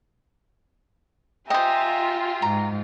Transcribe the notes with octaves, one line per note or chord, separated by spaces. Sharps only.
F4 G4 C5 D#5 E5 G5 G#5 A#5
G#2 A#5